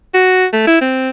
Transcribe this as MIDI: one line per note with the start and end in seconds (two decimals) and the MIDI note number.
0.14 0.45 66
0.53 0.67 57
0.67 0.78 64
0.81 1.10 60